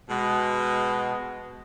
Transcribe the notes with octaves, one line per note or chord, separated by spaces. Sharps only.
B2 G#3